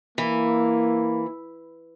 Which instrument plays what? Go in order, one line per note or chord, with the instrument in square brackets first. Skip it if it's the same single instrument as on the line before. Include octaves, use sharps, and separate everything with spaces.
[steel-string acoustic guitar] E3 [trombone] A#3